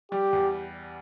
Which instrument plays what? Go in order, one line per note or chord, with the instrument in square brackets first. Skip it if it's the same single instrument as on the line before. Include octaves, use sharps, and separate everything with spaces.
[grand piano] G3 [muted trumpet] G4
[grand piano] E2